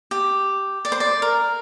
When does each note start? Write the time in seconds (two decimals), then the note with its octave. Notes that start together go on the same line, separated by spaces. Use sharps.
0.11 G4
0.85 D5
0.92 C5
1.00 D5
1.22 A#4